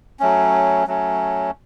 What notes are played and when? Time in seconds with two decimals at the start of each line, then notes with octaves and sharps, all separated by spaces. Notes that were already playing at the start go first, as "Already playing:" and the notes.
0.20 F#3 A3 C#4
0.87 F#3 A3 C#4